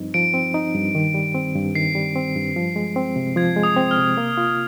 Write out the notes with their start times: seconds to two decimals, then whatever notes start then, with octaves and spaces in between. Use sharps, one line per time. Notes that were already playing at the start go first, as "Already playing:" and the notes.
Already playing: G2 F3 C4 D#4
0.14 F3 D7
0.34 C4
0.54 D#4
0.74 G2
0.95 D#3
1.14 G3
1.35 C4
1.55 G2
1.75 D#3 C7
1.95 G3
2.16 C4
2.36 G2
2.56 F3
2.76 G#3
2.96 C4
3.16 C3
3.36 F3 G#6
3.56 G#3
3.63 D#6
3.76 C4
3.91 F6
3.97 C3
4.17 A#3
4.37 F4